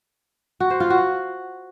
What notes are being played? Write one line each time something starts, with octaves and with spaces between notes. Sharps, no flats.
F#4
C5
F4
F#4